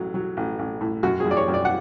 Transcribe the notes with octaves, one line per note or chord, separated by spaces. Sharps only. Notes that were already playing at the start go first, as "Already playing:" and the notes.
Already playing: A1 F#3
F#3
A1
A1
A2
F#2 F#4
G#4
F#2
D5
C#5
F#2
D5
F#5